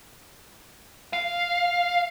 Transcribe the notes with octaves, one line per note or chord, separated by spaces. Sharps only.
F5